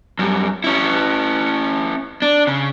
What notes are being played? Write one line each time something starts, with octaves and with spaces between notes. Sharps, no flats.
F#2 G3
C#4 E4
D4
C#3